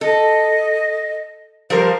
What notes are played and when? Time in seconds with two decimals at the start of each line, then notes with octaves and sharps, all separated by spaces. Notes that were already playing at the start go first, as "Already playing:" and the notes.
0.01 A4 D#5
1.70 F3 G3 A#4 C5